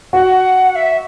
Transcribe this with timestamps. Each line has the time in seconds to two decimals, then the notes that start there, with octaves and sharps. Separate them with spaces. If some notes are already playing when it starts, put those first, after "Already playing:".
0.13 F#4 F#5
0.75 E5